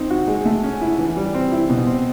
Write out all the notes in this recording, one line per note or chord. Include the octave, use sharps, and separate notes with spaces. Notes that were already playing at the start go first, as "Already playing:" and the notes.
Already playing: C4 D#4
F#4
G#3
A3
C#4
E4
E3
G3
C4
E4
B2
C4